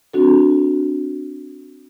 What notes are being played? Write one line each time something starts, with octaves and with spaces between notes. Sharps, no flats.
C4 D4 F#4 A4